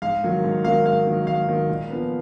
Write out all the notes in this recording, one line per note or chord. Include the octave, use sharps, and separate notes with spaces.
G#2 F5
D#3 F#3 A#3
G#2
D#3 F#3 A#3 F5
G#2 F5
D#3 F#3 A#3
G#2 F5
D#3 F#3 A#3
A#2
F3 B3